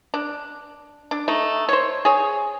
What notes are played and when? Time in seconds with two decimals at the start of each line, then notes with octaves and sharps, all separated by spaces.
0.14 D4
1.11 D4
1.28 A3 D#4
1.69 C5 C#5
2.05 G#4 C#5